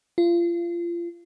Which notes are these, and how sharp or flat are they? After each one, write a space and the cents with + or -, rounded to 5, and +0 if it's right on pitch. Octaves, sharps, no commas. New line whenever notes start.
F4 -30